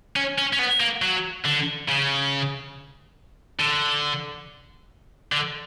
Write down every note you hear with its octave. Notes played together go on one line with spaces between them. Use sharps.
C#4
C#4
C#4
B3
A#3
F#3
D3
C#3
D3
D3